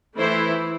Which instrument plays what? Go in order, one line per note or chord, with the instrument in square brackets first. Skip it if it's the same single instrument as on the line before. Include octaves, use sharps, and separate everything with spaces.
[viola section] E3 A3 E4 C5